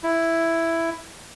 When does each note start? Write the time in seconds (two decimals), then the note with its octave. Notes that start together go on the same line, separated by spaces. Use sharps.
0.03 E4